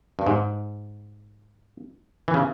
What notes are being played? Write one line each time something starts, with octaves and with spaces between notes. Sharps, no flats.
G2
G#2
E3
C#3